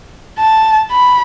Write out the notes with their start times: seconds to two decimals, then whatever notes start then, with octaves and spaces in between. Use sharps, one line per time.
0.39 A5
0.92 B5